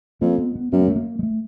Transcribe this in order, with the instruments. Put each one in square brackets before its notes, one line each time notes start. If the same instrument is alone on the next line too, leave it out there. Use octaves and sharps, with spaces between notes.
[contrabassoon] F2 [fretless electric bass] A#3
[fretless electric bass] B3
B3
[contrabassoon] F#2 [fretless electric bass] B3
[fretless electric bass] A#3
A3
A#3
G#3
A3